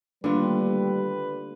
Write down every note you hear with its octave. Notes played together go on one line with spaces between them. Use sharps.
D3 D#3 G3 A3 A#3 F4 B4